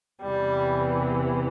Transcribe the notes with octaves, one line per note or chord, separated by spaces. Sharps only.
E2 C3 E3 G3